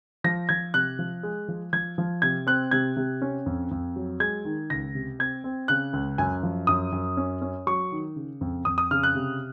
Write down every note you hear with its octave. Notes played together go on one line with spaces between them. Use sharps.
F3 A#6
F3 G#6
C3 F#6
F3
G#3
F3
F3 G#6
F3
C3 G#6
C4 F#6
C3 G#6
C3
C#4
F2
F2
F#3
G#3 G#6
D#3
C#2 A#6
C3
C4 G#6
C4
C#3 F#6
C#2
F#2 G#5
F3
F#2 D#6
F#2
C#4
C#4
F#3 C#6
D#3
C#3
F2
F2 D#6
D#6
C#3 F6
F#6
C3